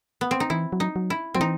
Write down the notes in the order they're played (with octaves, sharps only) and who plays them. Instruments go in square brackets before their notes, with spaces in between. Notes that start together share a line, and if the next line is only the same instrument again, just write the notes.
[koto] B3
C4
D#4
[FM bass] E3 [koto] E4
[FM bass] F#3
[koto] D#4
[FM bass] F#3
[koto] E4
[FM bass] F#3 [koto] C4
[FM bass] E3 [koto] D#4